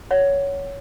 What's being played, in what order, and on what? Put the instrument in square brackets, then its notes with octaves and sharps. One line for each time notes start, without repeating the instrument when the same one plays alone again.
[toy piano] C#5 F#5